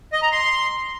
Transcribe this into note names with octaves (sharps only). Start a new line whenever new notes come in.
D#5
A#5
C6